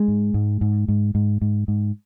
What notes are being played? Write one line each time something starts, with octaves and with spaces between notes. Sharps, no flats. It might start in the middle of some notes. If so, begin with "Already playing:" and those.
Already playing: G#3
G#2
G#2
G#2
G#2
G#2
G#2
G#2